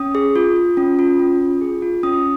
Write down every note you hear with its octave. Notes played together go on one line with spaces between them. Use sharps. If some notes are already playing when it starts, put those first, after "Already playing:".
Already playing: C#4 D#6
G#4
F4
F4
C#4
F4
C#4
F4
G#4
F4
C#4 D#6